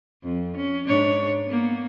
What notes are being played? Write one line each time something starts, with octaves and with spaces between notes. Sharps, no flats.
F2
C#4
G#2 D4 C#5
A#3 B3